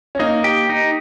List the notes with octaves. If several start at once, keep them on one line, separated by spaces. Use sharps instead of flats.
C#4
A#3 D#4
G4
D#4